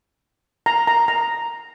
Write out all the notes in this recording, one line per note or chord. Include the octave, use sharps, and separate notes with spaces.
A#5
A#5
A#5